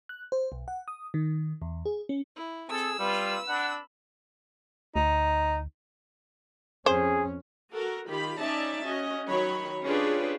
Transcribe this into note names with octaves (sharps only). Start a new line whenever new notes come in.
F#6
C5
B1
F#5
D#6
D#3
E2
G#4
C#4
E4
C4 G#4 A4 E6
G3 F4 B4
D4 F#5 B5
D2 D#4
F2 C#4 G#4 C5
F#4 A4 A#4
D#3 F4 G4 B5
C#4 D#4 D5 E5 A5
C#4 F#4 D#5
D#3 F#3 C#5 B5
C#4 D4 F4 G4 G#4 B4